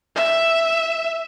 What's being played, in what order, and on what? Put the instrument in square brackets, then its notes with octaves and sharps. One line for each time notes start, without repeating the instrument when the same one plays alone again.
[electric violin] E5